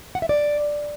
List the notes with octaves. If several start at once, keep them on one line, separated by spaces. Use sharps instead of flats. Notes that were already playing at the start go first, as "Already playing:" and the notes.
F#5
E5
D5